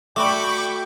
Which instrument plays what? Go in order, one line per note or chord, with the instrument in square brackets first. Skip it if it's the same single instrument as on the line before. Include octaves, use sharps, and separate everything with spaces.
[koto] A3 F#4 D5 [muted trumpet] G5 [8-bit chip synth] B5 C#6 D6